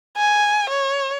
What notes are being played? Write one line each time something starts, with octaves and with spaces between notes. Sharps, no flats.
G#5
C#5